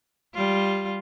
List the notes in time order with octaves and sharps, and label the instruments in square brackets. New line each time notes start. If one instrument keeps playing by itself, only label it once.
[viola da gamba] G3 F4